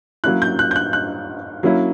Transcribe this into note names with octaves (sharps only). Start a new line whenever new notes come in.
F#3 A#3 C#4 E4 F#6
G6
F#6
G6
F#6
F#6
F#3 A#3 C#4 E4